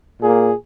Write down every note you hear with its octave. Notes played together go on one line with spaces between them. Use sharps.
A#2 A#3 G#4